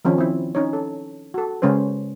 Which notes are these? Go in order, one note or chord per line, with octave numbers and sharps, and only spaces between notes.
D#3 F3 C4 C#4
C4 E4
C#4 D#4 C#5
A4
F#4 A4
C#3 G#3 C#4 B4 C5